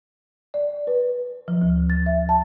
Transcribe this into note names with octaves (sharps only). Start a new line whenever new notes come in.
D5
B4
F3
D2
A6
E5
A5